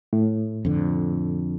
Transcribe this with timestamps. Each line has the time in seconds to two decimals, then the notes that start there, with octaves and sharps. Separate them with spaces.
0.13 A2
0.65 F2 D3